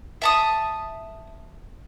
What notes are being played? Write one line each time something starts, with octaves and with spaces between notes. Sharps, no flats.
E5 A5 D#6